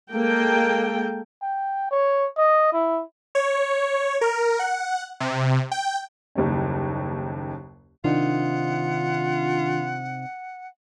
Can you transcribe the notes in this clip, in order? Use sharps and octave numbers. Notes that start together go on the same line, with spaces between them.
G#3 A#3 A4 G5
G5
C#5
D#5
E4
C#5
A#4
F#5
C3
G5
F#1 D#2 G3 C#4
C3 D#3 D4 D#4 F4 F#5